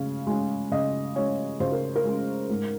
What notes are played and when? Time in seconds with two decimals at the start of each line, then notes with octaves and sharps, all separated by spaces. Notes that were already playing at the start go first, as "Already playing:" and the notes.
Already playing: C#3 G#3 C#4
0.27 G#3 C#4
0.71 C#3 D#5
1.15 G#3 C#4 C#5
1.60 C#3 C5
1.72 A#4
1.96 A#4
2.05 G#3 C#4
2.50 G#2